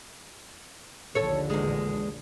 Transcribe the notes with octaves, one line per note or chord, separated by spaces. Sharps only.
A#1 D#2 D3 A4 C#5
E2 G#3